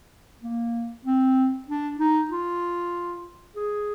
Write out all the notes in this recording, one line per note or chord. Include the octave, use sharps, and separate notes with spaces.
A#3
C4
D4
D#4
F4
G#4